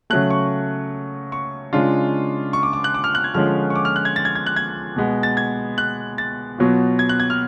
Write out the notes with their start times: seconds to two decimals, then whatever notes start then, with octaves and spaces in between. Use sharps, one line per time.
0.10 C#3 F#3 A3 F#6
0.30 C#6
1.32 C#6
1.73 C#3 G#3 D4 F4
2.53 C#6
2.63 D6
2.73 D6
2.84 F#6
2.94 D6
3.04 F6
3.15 F#6
3.24 G#6
3.34 D3 F3 G#3 C#4 F4 F6
3.70 C#6
3.76 D6
3.85 F6
3.96 F#6
4.05 G#6
4.16 A6
4.25 G#6
4.35 G#6
4.46 F#6
4.56 G#6
4.96 B2 G#3 B3
5.23 A6
5.37 G#6
5.78 F#6
6.18 A6
6.58 B2 F#3 B3 F4
6.99 G#6
7.09 F#6
7.20 G#6
7.30 F6